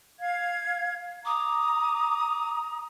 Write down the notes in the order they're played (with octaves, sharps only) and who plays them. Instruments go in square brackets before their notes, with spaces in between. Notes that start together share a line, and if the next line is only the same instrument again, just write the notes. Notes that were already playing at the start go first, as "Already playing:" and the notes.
[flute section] F5 G#6
[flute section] A#5 [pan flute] D6 [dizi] D#6